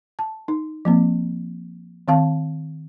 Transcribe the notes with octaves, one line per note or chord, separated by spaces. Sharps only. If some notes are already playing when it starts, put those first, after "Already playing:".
A5
D#4
F3 A#3 C4
D#3 C4 F5 A5